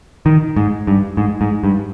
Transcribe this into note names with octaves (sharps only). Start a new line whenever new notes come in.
D#3
G#2
G2
G#2
G#2
G2